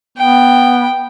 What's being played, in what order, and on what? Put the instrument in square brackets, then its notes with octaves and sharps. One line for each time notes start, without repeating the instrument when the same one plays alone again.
[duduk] B3 [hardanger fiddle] G5